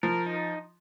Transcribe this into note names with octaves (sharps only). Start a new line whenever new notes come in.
F3 A#4
D#4